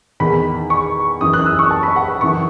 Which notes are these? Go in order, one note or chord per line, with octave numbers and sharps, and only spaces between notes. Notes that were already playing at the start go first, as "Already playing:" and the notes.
E2 D#3 B5
C#6
F#2 E3 D#6
F#6
E6
C#6
A5
B5
F#5
B5
F#2 C#3 E3 C#6